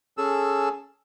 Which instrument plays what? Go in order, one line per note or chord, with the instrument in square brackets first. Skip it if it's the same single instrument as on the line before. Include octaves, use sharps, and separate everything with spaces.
[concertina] C#4 G#4 A4 E6